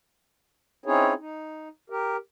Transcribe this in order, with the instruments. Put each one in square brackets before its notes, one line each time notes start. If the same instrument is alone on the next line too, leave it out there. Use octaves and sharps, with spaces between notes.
[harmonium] C4 C#4 D#4 E4 G#4 C#5
D#4
G4 A#4